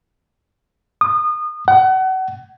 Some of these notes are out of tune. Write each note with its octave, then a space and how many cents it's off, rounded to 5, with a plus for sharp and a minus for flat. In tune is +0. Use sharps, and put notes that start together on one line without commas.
D#6 -30
F#5 +30